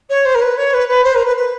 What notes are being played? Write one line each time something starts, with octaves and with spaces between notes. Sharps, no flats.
C#5
C5
A#4
B4
C#5
B4
B4
C5
A#4
B4
B4